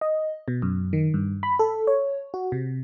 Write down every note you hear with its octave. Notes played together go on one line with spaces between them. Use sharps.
D#5
B2
F#2
D#3
G2
B5
A4
C#5
F#4
C3